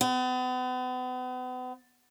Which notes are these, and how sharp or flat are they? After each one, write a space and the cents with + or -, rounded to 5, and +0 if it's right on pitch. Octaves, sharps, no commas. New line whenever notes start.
B3 +40